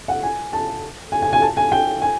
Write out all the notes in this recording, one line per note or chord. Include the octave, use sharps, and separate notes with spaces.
F#5
G#5
A5
G#5
G#5
G#5
A5
G#5
G5
G#5